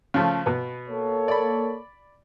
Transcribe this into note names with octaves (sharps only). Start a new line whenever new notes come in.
C#3 F3 A3
B2 B3
A#3 A4 C#5
D5 B5